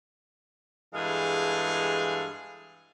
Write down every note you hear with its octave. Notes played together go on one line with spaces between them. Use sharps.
G2 E3 G#3 G#4 A4 F5